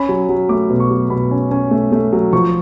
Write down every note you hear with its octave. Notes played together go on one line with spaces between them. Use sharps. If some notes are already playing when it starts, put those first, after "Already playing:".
Already playing: C#4 B5
F#3
F#3
A3 D6
B2
C#6
F#3
B2 B5
C#4
C#4
A3
A3
F#3
F3 C#6